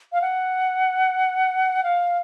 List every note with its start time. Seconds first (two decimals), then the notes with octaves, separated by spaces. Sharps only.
0.12 F5
0.22 F#5
1.84 F5